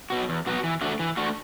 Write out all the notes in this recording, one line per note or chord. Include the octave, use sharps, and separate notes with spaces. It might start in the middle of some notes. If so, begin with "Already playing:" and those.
B2 F#3 B3 F#4
E2
B2 F#3 B3 F#4
E3
A3 D4 F#4
E3
A3 D4 F#4